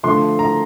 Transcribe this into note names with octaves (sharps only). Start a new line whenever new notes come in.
D3 F3 A3 C6
A#5